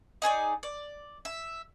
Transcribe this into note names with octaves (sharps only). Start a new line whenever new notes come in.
D#4 G#4 C5 D5
D5
E5